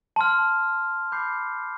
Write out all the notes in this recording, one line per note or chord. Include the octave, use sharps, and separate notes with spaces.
A5 C6 F6
B5 D6 G6 C7